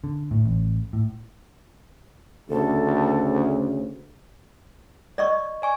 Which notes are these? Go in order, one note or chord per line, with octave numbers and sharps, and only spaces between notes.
D3
A2
A1
A2
D2 C#3 A4
D5 D#5 C#6
D5 G#5 C#6